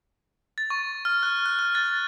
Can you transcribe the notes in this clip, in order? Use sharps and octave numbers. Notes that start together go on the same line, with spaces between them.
A6
C#6
F6
F#6
F#6
F#6
A6